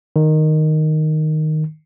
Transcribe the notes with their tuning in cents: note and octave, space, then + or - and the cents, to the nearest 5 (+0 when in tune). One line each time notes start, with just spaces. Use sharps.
D#3 -5